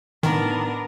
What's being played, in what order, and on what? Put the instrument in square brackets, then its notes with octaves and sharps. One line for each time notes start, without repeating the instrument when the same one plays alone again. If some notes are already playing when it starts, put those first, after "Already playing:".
[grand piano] A2 D#4 [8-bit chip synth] D#3 [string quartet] B3 D4 A#4